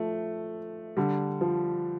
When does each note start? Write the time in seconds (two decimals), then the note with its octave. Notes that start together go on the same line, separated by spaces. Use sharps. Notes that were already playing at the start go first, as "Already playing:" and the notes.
Already playing: F3 A3
0.97 D3 G3
1.41 F3